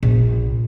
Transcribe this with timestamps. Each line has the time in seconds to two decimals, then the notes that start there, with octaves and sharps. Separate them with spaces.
0.03 A#1